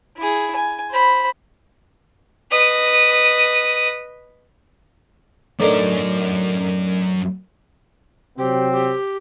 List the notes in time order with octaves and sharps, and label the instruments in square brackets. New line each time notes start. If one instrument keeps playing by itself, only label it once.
[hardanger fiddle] E4 G#4
G#5
C5 B5
[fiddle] B4 D#5
[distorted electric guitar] F#2 A#4 [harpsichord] A2 D3 D#3
[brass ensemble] C3 F#3 C4 [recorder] G4
[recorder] G4